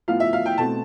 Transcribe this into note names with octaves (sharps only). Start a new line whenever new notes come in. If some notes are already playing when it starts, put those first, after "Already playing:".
A2 F3 B3 F5
E5
F5
G5
B2 A3 C4 A5